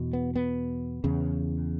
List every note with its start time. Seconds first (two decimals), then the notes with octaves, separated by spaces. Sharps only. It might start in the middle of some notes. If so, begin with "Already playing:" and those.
Already playing: E2 B2
0.13 B3
0.35 B3
1.04 E2 C#3